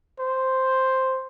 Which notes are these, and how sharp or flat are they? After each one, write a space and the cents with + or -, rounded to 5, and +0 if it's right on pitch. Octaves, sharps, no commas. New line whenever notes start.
C5 +0